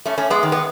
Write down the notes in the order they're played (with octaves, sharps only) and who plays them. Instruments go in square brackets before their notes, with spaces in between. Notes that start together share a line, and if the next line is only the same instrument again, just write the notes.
[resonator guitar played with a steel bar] A3 C#4
A3 C#4
G#3 B3
D#3
B3